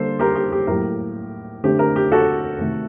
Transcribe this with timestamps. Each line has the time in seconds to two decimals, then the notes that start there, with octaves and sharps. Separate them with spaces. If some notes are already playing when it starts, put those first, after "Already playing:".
Already playing: D3 G3 A#3 A4 C5
0.19 G4 A#4
0.35 G4
0.52 G4
0.67 A2 F#3 A#3 G4 A#4
1.64 D3 A3 C4 G4
1.79 G4 A#4
1.96 G4
2.12 F#4 A4
2.58 C3 D#3 A3